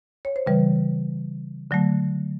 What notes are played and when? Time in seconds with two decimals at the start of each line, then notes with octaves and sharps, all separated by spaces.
0.25 C#5
0.36 C5
0.46 C#3 E3 G3 B4
1.71 D3 F#3 A3